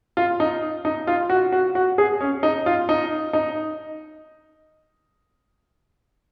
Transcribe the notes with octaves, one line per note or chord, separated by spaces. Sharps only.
F4
D#4
D#4
F4
F#4
F#4
F#4
G#4
C#4
D#4
F4
D#4
D#4